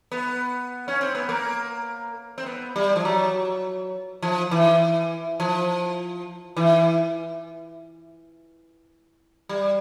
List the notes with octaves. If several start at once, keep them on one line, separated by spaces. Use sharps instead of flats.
B3
C#4
C4
B3
A#3
C4
B3
G3
F3
F#3
F3
E3
F3
E3
G3